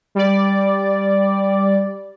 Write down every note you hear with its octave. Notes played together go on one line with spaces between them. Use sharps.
G3 D5